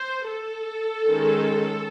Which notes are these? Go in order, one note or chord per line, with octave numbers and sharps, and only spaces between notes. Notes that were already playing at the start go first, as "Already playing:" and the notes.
Already playing: C5
A4
D#3 G#3 C#4